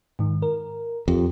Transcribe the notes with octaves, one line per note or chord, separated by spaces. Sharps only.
G#2 D#3
A#4
F2 G4